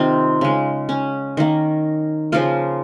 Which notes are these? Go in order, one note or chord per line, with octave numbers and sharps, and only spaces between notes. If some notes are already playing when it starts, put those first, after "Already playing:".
Already playing: C3 D#3 C4 D#4 F4
C#3 G#3
C#4
D#3 A#3
C#3 F3 A#3 F4